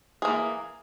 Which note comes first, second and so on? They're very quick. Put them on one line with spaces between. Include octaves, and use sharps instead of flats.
G#4 A#3 E3